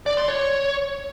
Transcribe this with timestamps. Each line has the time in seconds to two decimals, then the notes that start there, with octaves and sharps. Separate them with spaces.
0.06 D5
0.17 C6
0.28 C#5